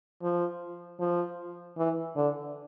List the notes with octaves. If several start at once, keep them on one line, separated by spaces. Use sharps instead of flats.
F3
F3
E3
D3